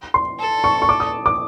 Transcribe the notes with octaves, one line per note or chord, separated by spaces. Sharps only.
C6
A4
C#6
C#6
D6
D#6
D6